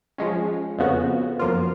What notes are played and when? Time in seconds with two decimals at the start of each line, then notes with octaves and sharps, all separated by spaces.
0.18 F3 G#3 C#4
0.78 F2 C#3 F3 B3 F#4
1.39 F#2 F3 A#3 F4